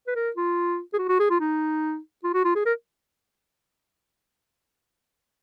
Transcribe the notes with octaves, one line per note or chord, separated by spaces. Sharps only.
B4
A#4
F4
G#4
F#4
F#4
G#4
F4
D#4
F4
F#4
F4
G#4
A#4